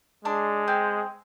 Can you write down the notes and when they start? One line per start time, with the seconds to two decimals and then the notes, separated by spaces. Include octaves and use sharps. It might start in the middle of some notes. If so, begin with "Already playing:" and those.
0.25 G#3 D4
0.68 C4